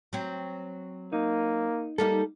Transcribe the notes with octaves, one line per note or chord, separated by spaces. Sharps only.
F#3 C4
A#3 D#4
G3 A#3 D#4 A4